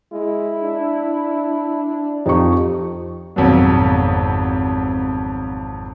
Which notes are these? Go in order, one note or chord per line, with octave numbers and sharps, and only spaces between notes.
G#3 E4
D4
F2 D#4 G4 C#6
G#1 F2 B2 F#3